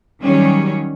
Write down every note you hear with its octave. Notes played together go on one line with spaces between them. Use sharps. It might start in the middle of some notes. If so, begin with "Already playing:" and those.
D#3 F#3 G3 C#4